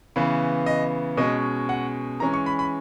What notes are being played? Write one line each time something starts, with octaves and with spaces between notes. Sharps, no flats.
C#3 E3 B3
D#5
B2 G#3 C#4 D#5
F#5
E3 G#3 C#4 A#5
C#6
B5
B5